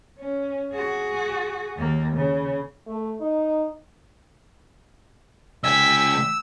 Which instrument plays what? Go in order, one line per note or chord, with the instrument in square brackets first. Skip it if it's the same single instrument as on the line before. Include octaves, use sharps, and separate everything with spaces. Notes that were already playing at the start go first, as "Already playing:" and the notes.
[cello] C#4
F#4 G#4
D#2 A#3
C#3
[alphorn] A3
D#4
[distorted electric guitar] C#2 G#5 [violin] G5 B6 [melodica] E6